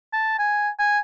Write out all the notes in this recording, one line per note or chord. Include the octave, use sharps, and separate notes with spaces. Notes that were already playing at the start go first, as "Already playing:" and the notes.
A5
G#5
G#5